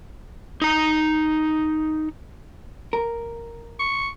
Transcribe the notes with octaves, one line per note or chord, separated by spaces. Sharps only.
D#4 A#5
A#4
C#6